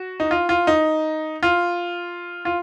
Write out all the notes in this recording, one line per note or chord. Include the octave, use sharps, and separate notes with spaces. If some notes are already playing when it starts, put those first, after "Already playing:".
Already playing: F#4
D#4
F4
F4
D#4
F4
F4